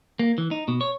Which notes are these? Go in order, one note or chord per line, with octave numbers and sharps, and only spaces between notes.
A#3
E3
D#4
B2
C#5